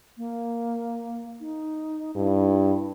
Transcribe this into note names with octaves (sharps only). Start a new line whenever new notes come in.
A#3
D#4
G2 E4